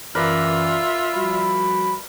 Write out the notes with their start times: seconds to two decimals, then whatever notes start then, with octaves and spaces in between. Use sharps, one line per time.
0.15 F#2 E3 F4 A#4 B4 D5 E5
1.15 F3 G3 F#4 B5